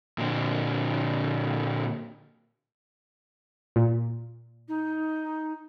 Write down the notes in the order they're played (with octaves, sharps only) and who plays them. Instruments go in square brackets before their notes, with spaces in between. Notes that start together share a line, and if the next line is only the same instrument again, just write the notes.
[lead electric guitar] A#2 D3
[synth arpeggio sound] A#2
[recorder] D#4